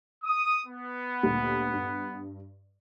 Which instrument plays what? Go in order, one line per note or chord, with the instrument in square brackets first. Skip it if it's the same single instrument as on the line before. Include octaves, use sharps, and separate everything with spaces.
[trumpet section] D#6
B3
[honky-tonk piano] D2 A#2 G3
G2